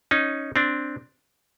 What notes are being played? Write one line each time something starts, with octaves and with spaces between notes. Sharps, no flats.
C#4 D#4
C4 D4